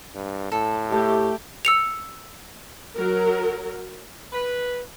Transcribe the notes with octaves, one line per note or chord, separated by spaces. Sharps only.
G2
A2 A4
A3 G4
E6 C#7 F7
F#3 A#4
B4